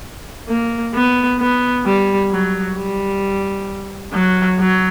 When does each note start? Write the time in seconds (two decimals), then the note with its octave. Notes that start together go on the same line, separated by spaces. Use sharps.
0.48 A#3
0.94 B3
1.39 B3
1.85 G3
2.30 F#3
2.76 G3
4.13 F#3
4.59 F#3